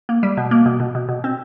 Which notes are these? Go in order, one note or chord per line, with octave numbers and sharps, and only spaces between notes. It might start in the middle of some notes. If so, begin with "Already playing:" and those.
A#3
G3
B2
A#3
B2
B2
B2
B2
C4